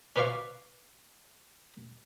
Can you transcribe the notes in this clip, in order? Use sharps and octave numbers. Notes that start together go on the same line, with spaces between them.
C#4 B4 C5 D5 F5 C#6